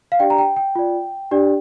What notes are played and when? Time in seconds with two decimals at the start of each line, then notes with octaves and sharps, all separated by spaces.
0.12 F5
0.19 D4 G4 D5 G5
0.30 A#5
0.38 G5
0.56 G5
0.75 F4 D5
1.31 D4 G4 D5